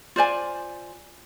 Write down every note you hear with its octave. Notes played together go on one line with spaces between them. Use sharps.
F4 C5 D5 G#5